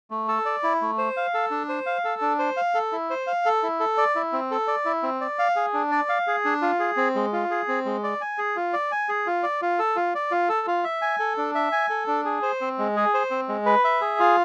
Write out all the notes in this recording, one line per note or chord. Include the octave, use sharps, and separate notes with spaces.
A3
A4
D5
E4
A3
C5
F5
A4
D4
C5
F5
A4
D4
C5
F5
A4
E4
C5
F5
A4
E4
A4
D5
E4
C4
A4
D5
E4
C4
D5
F5
G#4
D4
D5
F5
G#4
D4
F4
G#4
C4
G#3
F4
G#4
C4
G#3
D5
G#5
G#4
F4
D5
G#5
G#4
F4
D5
F4
A4
F4
D5
F4
A4
F4
E5
G#5
A4
D4
E5
G#5
A4
D4
G#4
C5
C4
G#3
G#4
C5
C4
G#3
B4
E5
G#4
F4